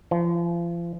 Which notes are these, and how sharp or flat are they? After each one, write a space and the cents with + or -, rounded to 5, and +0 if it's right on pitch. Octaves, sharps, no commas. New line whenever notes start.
F3 -35